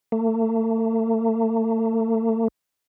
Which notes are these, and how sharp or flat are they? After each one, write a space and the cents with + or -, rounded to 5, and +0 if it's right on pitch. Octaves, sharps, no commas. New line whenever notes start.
A3 +40